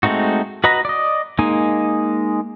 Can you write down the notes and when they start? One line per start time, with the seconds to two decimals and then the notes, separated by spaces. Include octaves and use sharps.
0.03 G#3 A3 C4 D#4 F#4
0.64 F#4 B4 D#5 A#5 B5
0.85 D5 D#5
1.39 G#3 A#3 D#4 G#5